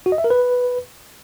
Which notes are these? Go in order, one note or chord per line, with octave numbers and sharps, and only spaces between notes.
F#4
D#5
E5
A#4
B4